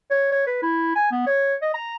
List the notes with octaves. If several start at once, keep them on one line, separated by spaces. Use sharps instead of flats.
C#5
C#5
B4
E4
G#5
B3
C#5
D#5
A#5